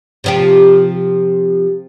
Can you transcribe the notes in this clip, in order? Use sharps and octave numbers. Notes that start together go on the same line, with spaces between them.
C3 F3 G4